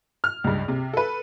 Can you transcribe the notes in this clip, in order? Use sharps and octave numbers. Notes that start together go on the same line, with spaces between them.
F6
C#2 G2
C3
A4 B4